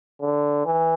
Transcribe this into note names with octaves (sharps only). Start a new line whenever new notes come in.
D3
E3